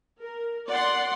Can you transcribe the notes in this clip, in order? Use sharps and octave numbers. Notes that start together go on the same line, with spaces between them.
A#4
D5 F#5 C6